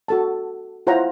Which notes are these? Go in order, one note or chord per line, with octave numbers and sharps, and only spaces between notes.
F#4 A4 A5
E4 F4 C5 C#5 F#5 A#5